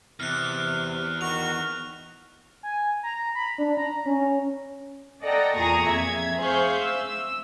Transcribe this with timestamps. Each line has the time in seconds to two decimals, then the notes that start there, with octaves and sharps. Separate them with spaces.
0.20 E2 C3 F6 F#6
1.21 D#3 F#4 F6 F7
2.63 G#5
3.03 A#5
3.35 B5
3.58 D4
3.77 A#5
4.06 C#4
5.23 A4 D5 D#5 F#5 G5 A#5
5.56 E2 A#2 G#4 A#5 C#6 D#6
5.87 F2 E5 G#6
6.38 G#4 C5 E5 F5 C#6 G6
6.81 E6